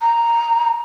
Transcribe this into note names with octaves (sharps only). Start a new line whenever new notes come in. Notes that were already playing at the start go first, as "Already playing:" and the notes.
A#5